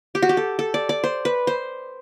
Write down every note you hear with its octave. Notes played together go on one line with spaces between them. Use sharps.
G4
F#4
G4
A4
A4
D5
D5
C5
B4
C5